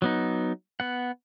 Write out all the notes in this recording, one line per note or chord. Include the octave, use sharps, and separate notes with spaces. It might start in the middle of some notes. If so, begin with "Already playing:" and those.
F#3 B3 D#4
B3 F#5